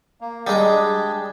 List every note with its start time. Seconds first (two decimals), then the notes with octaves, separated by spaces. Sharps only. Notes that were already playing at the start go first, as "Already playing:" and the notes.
0.21 A#3
0.47 G3 G#3 D4 G4 G#4